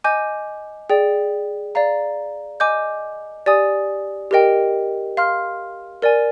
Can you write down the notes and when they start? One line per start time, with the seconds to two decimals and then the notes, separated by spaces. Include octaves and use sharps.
0.04 D#5 G#5 D6 G6
0.90 G#4 D5 G5
1.75 D5 F5 A#5
2.60 D#5 G#5 D6 G6
3.46 G4 D5 G#5 D#6
4.31 G4 A#4 D#5 G5
5.17 F5 C6 F6
6.02 A#4 D5 G#5